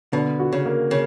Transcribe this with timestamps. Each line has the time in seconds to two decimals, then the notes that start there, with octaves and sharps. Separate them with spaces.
0.13 B2 D3
0.40 F#4
0.53 C#3
0.66 A#3
0.91 C#3